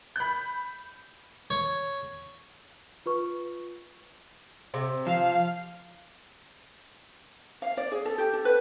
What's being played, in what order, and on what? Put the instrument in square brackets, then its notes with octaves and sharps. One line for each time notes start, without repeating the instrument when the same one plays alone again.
[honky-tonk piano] B5 G6
[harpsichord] C#5
[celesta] F4 B4 C#6
[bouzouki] C3
[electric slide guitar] F3 [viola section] F5
[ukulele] F5
D5
G#4
A4
G4
A4
B4